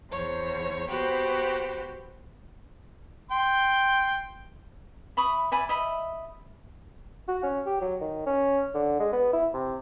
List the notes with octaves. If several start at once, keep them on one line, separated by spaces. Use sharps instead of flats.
E2 C5 C#5
B3 F#4 G4 C5
G5 C6
E5 B5 C#6 D#6
D5 E5 G#5 B5
D#5 E5 B5
F#4
C#4
G4
F#3
D#3
C#4
D3
G#3
B3
E4
C3